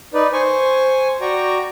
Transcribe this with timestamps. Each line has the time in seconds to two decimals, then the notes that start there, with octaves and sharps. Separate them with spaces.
0.14 D#4 B4 D5
0.33 C5 G#5 C#6
1.21 F#4 D5 G5 A#5 C#6